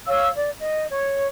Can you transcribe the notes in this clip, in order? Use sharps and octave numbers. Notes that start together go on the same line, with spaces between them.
C#5 F5 E6
D5
D#5
C#5